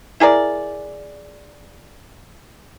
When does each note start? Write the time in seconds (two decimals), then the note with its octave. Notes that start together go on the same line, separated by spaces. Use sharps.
0.20 E4 G#4 A#4 D5